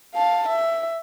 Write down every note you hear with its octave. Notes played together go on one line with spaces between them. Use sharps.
F5 A5
E5